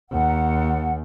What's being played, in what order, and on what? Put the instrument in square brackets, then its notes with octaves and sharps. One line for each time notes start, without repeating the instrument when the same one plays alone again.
[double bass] D#2 [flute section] F#5